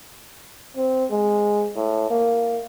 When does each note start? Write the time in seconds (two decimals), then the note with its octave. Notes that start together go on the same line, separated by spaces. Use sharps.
0.76 C4
1.11 G#3
1.76 A2
2.10 A#3